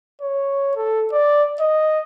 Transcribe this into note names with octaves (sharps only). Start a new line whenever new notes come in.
C#5
A4
D5
D#5